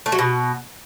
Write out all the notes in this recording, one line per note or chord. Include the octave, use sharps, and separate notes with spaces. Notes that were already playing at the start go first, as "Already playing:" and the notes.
A3
F#3
B2